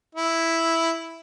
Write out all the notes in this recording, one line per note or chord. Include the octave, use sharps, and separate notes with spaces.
E4